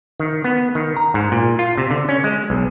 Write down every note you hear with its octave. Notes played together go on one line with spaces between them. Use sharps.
D#3
B3
D#3
A#5
G#2
A#2
F4
C3
D3
C#4
G#3
B1